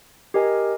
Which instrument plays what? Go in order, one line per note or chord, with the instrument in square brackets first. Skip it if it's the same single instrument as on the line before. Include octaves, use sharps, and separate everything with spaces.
[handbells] G4 A#4 D#5 G#5